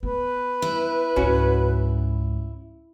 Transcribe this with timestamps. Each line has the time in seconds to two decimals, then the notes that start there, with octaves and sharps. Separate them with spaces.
0.03 B3 B4
0.62 E4
1.16 C#2 G#2 C#4 F#4